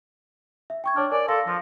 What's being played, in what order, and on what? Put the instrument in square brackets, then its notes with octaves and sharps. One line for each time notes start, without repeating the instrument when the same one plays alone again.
[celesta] E5
G5 C#6 G#6
[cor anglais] D4 [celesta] C#5 F6
[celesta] A#4 G#5 [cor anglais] D5
[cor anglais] A4 [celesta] F5 C6 A#6
[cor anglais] F3 [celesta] A#6